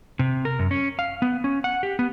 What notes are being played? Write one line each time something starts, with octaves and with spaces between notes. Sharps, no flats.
C3
A#4
F#2
C#4
F5
B3
C#4
F#5
G4
B3